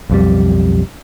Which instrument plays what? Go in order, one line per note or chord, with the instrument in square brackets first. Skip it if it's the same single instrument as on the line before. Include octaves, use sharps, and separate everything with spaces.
[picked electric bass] B1 F2 G3